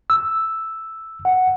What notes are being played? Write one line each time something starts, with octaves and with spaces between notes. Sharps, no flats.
E6
F#5